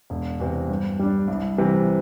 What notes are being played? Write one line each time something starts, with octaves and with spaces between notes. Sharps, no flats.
E1
E2 C3
G2
G3 D4
C2
C3 E3 G3